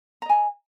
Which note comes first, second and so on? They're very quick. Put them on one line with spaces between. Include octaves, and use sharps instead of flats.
A#5 D#5 G#5